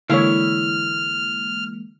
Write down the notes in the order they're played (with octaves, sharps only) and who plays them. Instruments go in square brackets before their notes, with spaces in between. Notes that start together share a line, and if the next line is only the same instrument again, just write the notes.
[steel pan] D3 C#5 [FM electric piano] E3 G#3 A#3 [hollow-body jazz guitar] E4 F5 [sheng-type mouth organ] F6